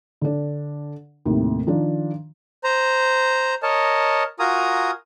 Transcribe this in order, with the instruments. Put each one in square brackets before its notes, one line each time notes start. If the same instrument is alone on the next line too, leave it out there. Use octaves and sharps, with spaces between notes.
[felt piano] D3 D4
D#2 A2 C3
D#3 F3 D4
[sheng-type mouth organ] C5 A#5
A#4 C#5 D#5 A5
F4 F#4 A#4 G#5 A#5 D#6